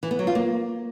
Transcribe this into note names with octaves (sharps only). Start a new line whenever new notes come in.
E3
B3
F#3
F4
A#3